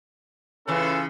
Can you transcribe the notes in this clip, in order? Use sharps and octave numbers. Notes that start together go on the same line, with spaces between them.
C#3 E3 C#4 F4 A4